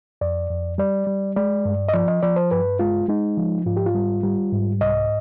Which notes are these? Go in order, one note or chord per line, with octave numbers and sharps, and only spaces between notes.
F2 D5
F2
G3 D5
G3
G#3 D5
G2
D#5
F3 D5
D#5
F3 D5
C5
G2 B4
G#3 F4
G#3 D#4
F3
G#2 F4
G4
F4
G3
G3
G#2
C2 D#5